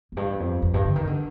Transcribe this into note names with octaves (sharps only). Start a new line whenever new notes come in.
F2
G2
F2
F2
G2
D3
D#3
D3